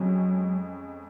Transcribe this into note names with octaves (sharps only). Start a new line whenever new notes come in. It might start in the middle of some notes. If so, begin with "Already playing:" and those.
Already playing: F2 F#3 G#3 C#4